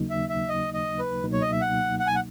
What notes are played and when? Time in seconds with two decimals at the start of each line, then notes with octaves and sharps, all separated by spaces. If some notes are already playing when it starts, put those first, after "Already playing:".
Already playing: D#2 C#3 F#3 A#3 D#4
0.10 E5
0.29 E5
0.48 D#5
0.74 D#5
0.99 B4
1.24 C#2 B2 F#3 A#3 D#4
1.33 C#5
1.41 D#5
1.52 E5
1.61 F#5
1.99 F#5
2.07 G#5
2.15 F#5